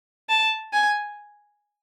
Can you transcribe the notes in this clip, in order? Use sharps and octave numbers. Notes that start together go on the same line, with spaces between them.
A5
G#5